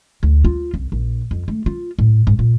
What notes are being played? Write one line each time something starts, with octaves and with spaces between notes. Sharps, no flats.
D2
F4
C2
A#1
F2
A3
F4
A2
G#2
A#2